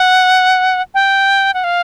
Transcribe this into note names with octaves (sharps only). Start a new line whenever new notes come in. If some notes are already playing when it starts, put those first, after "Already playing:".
Already playing: F#5
G5
F#5
F5